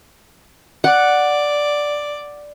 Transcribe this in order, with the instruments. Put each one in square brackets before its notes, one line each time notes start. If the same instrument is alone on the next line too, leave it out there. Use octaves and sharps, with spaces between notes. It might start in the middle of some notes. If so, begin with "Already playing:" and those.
[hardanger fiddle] D5 [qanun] F#5